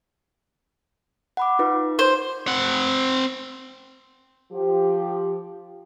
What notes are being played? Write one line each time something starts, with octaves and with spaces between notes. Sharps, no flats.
F#5 B5 D6
D#4 F4 B4
C5
C4 F#5
F3 G4